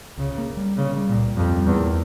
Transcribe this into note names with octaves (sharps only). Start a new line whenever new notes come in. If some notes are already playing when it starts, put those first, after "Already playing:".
C#2 C#3
A#3
G3
C#3 A#3
G3
A#2
C#2
F2 G3
G3
E2
A#3